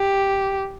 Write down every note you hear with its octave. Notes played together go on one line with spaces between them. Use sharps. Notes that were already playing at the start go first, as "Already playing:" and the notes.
Already playing: G4